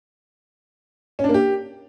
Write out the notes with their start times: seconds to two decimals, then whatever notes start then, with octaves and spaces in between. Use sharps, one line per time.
1.19 C#4
1.24 D4
1.29 A#3
1.34 G4